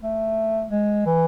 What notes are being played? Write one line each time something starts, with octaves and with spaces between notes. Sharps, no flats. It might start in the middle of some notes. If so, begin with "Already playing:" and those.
A3
G#3
E3